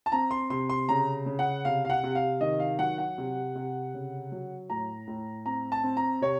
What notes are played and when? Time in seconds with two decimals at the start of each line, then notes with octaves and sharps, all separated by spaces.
0.06 A5
0.12 C4 A#5
0.31 C6
0.50 C3 C6
0.69 C6
0.89 C#3 A#5
1.26 C#3
1.39 F#5
1.65 C3 F5
1.85 F5
1.90 F#5
2.03 C3
2.15 F5
2.41 D#3 D#5
2.60 F5
2.79 F#3 F#5
2.98 F#5
3.18 C3
3.55 C3
3.94 C#3
4.32 F#3
4.70 A2 A#5
5.07 A2
5.46 C4 A#5
5.72 A5
5.83 C4
5.97 A#5
6.22 C3 C#5